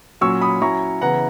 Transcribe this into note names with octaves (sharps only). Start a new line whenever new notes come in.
A#2 F#3 C#4 C#6 E6
B5 D#6
F#3 C#4 E4 A#5 C#6
C#3 E3 B3 E4 F#5 A#5